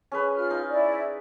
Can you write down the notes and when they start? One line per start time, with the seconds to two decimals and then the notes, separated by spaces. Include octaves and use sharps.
0.12 C#4 G#4 B4
0.35 F4 F6
0.50 D#4
0.68 E4 D5